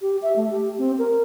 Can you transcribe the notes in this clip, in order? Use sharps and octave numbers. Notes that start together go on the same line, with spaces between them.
G4
E5
A3
G4
C4
A#4